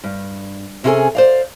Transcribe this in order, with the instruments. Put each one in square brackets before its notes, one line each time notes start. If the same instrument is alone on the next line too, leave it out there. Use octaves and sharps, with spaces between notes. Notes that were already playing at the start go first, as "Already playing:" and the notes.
[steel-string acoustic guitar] G2
C3 C#4 F4 G#4 A4 G#5
C5 D5 F5